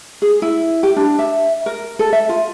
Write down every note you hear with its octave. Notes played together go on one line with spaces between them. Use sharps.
G#4
E4
G4
D4
E5
A#4
A4
E5
F4